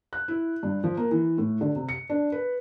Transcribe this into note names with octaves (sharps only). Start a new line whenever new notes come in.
F#6
E4
G2
F3
A#3
E3
A2
D3
C3
C#7
D4
B4